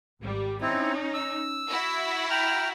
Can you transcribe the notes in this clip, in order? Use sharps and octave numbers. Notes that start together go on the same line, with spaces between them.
G#1 G3
C4 C#4 D#4 E4
E6
E4 F#4
G5 A#5 F6